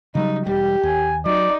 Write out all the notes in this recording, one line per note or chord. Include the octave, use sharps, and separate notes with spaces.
C#3 F#3 G3 D#4
E1 G3 G4
D#2 G#5
F#3 D#4 D5